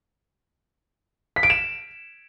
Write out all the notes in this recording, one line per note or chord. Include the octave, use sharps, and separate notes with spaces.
B6
D7
E7